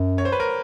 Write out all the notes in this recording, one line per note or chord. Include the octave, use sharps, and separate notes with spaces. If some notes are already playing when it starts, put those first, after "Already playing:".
Already playing: F#2
C#5
C5
B4
A#4